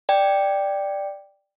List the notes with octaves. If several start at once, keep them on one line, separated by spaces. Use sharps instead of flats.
D5 G5